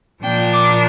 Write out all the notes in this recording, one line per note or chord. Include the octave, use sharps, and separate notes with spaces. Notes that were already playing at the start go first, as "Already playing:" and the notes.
A#2 F3 A#3 D4 G5
D6